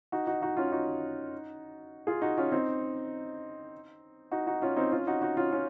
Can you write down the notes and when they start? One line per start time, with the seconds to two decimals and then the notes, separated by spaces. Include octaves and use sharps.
0.12 D#4 F#4
0.27 D#4 F#4
0.42 D#4 F#4
0.57 C#4 F4
0.72 D#4 F#4
2.07 F4 G#4
2.22 D#4 F#4
2.38 C#4 F4
2.52 C4 D#4
4.31 D#4 F#4
4.47 D#4 F#4
4.62 C#4 F4
4.76 C4 D#4
4.91 C#4 F4
5.07 D#4 F#4
5.21 D#4 F#4
5.37 C#4 F4
5.52 C#4 F4